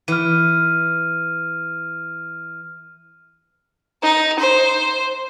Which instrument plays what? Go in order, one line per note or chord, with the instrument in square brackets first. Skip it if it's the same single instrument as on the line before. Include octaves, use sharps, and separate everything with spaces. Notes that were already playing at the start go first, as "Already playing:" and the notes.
[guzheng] E3 [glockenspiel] F6 D#7
[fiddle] D#4
C5